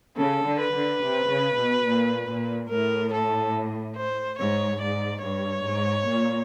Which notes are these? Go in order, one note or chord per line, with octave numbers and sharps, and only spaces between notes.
C#3 A4
D3
B4
D3
C3
C#3
B2
A#2
A#2
A2 A#4
A4
C5
G#2 C#5
G#2 D5
G2 C#5
G#2
A#2